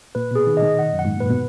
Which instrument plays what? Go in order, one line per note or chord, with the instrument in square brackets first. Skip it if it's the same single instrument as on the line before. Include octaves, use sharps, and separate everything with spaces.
[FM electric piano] A#2 [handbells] B4
[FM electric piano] B2 [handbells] G#4
[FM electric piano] D#3
[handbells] D#5
[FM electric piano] D#3
[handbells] F#5
[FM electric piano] F#2
[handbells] F#5
[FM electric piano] G#2
[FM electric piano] A#2 [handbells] B4
[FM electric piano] B2